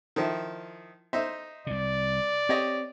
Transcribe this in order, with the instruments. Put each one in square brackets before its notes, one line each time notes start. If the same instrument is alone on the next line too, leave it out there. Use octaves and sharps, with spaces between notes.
[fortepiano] D#3 F3 E4
D#4 C5 E5
[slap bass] C2 C3 [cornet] D5
[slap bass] C4 [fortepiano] G4 C#5 D#5